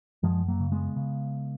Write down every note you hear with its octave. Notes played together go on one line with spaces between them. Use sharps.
F#2 F3 G#3
F#3 A#3
C#3
G#3 B3
C#3